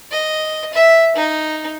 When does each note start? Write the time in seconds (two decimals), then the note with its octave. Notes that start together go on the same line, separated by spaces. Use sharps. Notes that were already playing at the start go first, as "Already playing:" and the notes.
0.11 D#5
0.74 E5
1.16 D#4